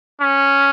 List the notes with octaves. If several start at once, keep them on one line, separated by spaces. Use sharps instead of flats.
C#4